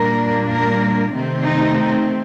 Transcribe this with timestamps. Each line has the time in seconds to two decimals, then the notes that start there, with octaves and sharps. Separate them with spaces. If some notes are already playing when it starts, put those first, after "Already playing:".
Already playing: A#2 G3 A#3 D4 A#4
0.51 A#4
1.13 C3 D#3 A3 C4
1.44 D#4